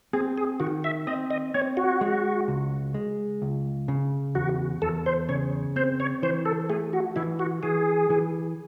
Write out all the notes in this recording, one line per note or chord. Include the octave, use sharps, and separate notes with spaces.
C4 G#4
G#4
D#3 F#4
E5
C4 D#5
D#5
C4 C#5
F#4
G#3
C#2
G#3
C#2
C#3
E2 F#4
E2 A4
C5
C#3 C#5
C4 C5
C#5
E3 C5
A4
A3 G#4
F#4
E3 E4
F#4
E3 G#4
E3